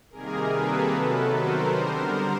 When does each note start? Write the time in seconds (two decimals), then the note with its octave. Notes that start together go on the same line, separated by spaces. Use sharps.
0.11 C3 D#3 G3 A#3 G#4 A#4
0.51 A4 B4
0.91 C3 D#3 F#3 B3 A4 B4
1.31 A#4 C5
1.70 D3 G3 B3 A#4 C5